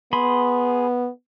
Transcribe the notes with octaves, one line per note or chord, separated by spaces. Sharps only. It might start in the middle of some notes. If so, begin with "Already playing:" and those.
B3 G#4 B5 C6